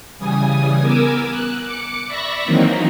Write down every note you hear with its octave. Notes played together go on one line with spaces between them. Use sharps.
C#3 E3 G3 G#5 D#6
B3 A#4 G#5 D6 E6
F#6
D6 C#7
D5 E5 B5 C#6 A#6
D#3 E3 F#3 A#3 C4 D#4